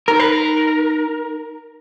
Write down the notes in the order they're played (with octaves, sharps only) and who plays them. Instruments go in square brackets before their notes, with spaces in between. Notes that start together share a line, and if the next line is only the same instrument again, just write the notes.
[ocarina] D#4 [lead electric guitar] A#4
[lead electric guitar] B4
A#4